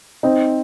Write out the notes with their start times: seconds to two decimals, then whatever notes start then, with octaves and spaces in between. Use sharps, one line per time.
0.23 C4 D#4